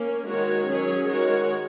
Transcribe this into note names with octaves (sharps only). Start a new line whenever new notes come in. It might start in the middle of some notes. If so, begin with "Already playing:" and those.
Already playing: A#3 C#4
D#3 G#3 F#4 A#4 C#5
F#3 C#4 G#4 C#5
D#3 G#3 F#4 A#4 C#5